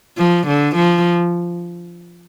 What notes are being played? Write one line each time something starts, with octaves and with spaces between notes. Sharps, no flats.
F3
D3
F3